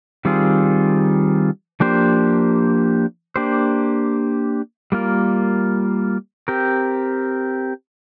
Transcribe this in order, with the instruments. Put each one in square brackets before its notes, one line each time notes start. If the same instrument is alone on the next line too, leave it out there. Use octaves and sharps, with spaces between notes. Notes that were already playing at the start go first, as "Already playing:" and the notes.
[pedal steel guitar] D#3 G3 C4 F4 G#4
F3 A#3 D4 G4 C5
A#3 D4 G4 C5
G3 A#3 F4 A#4
C4 G4 A#4